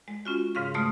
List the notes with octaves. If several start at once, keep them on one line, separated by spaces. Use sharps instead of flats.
G#3
C#4 F4 F#4
G#2 C#3 F5 C#6
B2 G#3 A3 C6 D#6 F6